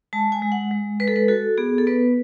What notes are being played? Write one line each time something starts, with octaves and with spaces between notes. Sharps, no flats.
G#3 A5
G#5
G#3
F#5
G#3
G#3 B4
A4
B4
F#4 A4
B3 G#4
A4
B3 B4